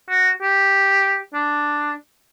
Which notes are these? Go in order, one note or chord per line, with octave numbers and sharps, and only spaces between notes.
F#4
G4
D4